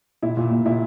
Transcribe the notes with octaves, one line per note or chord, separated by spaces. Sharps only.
A#2 E4
A#2
A#2
A#2 E4